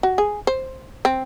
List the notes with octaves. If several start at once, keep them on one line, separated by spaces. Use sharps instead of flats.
F#4
G#4
C5
C4